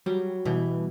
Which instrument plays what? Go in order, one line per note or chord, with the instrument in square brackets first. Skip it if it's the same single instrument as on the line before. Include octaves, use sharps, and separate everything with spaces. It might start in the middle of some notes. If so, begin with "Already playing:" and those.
[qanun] F#3 [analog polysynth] G3
[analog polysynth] B2 [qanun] E3